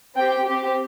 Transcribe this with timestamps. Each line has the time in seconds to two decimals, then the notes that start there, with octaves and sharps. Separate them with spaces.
0.16 C4 G4 G5
0.45 C4 G4